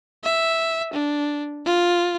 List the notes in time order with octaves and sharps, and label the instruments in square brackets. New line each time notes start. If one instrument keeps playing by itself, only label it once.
[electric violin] E5
D4
F4